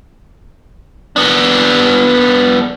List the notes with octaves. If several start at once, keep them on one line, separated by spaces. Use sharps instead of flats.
B3 D4